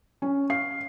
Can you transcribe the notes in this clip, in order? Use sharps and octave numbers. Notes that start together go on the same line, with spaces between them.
C#4
F5 C7